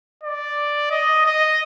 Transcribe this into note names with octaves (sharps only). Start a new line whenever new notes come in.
D5
D#5
D#5